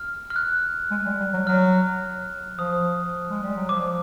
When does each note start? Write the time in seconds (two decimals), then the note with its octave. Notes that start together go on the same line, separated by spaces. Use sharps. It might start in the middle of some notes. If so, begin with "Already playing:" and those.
Already playing: F6
0.30 F6
0.36 F#6
0.91 G#3
1.06 G3
1.20 G3
1.33 F#3
1.47 F#3 F6
2.58 F3 D#6
3.30 G#3
3.43 G3
3.56 F#3
3.69 F3 D6